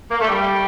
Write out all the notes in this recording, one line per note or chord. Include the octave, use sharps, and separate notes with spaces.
A#3
A3
G3